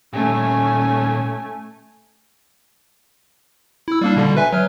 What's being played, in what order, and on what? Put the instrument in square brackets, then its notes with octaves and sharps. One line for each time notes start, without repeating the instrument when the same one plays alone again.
[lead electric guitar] A#2 G3 [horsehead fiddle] A3 G#5 [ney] C#4
[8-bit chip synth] E4 E6
G3 A#3 D4
B2 D3 G3
B4 E5 G#5
F#3 F6